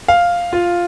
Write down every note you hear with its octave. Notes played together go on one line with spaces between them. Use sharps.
F5
F4